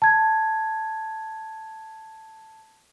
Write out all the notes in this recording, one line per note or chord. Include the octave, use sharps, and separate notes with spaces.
A5 G#6